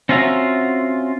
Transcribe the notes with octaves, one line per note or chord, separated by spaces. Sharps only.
C4 C#4 F4 F#4 E5 A#5